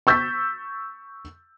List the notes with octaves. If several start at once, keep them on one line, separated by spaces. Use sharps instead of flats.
C#6 E6 G6 A6 B6